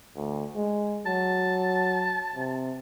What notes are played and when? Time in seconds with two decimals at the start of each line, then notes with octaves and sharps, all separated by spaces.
0.15 D2
0.55 G#3
1.06 F#3 A5
2.36 C3